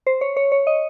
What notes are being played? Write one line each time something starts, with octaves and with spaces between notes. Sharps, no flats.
C5
C#5
C#5
C#5
D#5